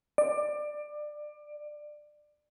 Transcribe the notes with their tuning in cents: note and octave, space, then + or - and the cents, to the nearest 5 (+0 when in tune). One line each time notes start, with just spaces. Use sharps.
D5 +25